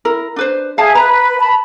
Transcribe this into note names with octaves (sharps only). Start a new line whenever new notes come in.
E4 A#4
D4 B4 C5
G#4 E5 F5 A5
B4 A#5
A5 B5